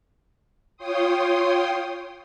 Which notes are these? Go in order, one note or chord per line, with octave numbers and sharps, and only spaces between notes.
F4 C#5 G5 C6 D#6